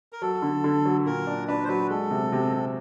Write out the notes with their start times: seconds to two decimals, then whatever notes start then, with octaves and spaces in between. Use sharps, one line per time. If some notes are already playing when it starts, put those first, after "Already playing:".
0.13 A#4
0.22 F#3 A4
0.42 D3
0.64 D3
0.86 F#3
1.06 A#2 A#4
1.27 D4
1.47 D4 B4
1.64 C5
1.68 F#3 B4
1.90 G#3 A4
2.11 C3
2.32 C3
2.53 C3